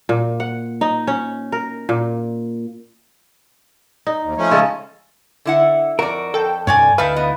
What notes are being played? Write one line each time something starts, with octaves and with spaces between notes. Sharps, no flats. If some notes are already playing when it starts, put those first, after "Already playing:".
A#2
F#5
D#4
C#4
A#4
A#2
D#4
D#2
F3 A3 C#4
C#3 G#3 A4
D3 E4 F#5
F2 F#4 A#4 D5
F2 A4 G5
C2 G2 C#5 D5 G#5
D2 D#4 E4 B4 F5 A5
B3 D#5